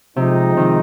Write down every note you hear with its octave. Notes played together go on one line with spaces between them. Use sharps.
C3 F3 G#3 C4 D#4
C3 D#3